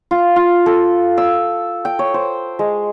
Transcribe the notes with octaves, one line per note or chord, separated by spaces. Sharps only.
F4
F4
A4
E6
G5
C#5
C5
G#3